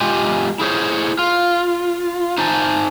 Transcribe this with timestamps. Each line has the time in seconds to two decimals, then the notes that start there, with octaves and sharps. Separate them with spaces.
0.01 G#3 F4 G4 G#5
0.60 E4 G#4 C5 C#5
1.19 F4
2.38 D#4 C5 G#5 A5